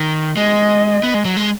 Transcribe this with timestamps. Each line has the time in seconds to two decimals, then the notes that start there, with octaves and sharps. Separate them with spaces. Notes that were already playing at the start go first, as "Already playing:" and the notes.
Already playing: D#3
0.37 G#3 D#5
1.03 B3
1.14 G#3
1.25 F#3
1.37 G#3